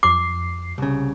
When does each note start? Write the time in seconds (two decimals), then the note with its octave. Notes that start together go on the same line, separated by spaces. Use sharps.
0.03 F2 D6 C7
0.78 C2 C#3